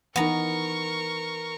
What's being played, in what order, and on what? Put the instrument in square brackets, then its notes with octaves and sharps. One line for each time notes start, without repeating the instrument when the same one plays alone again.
[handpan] E3 D#4 [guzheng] B3 A#5 [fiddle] A#4 C#6